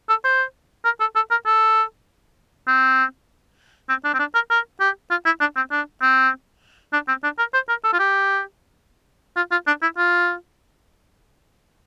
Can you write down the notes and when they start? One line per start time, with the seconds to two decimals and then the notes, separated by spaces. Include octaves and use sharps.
0.09 A4
0.24 C5
0.85 A#4
1.00 A4
1.15 A4
1.30 A#4
1.46 A4
2.67 C4
3.89 C4
4.04 D4
4.14 C4
4.19 D4
4.34 A#4
4.50 A#4
4.80 G4
5.10 F4
5.25 E4
5.40 D4
5.56 C4
5.71 D4
6.01 C4
6.93 D4
7.08 C4
7.23 D4
7.38 A#4
7.54 C5
7.69 A#4
7.84 A4
7.93 F4
7.99 G4
9.36 F4
9.51 F4
9.67 D4
9.82 E4
9.97 F4